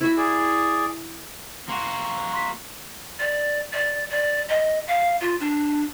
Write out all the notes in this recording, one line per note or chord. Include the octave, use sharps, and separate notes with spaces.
E4 F#4 E5
G#4 D5
A#3 F#4 F#5 C6 C#7
C6 B6
D5
D5
D5
D#5
F5
F4
D4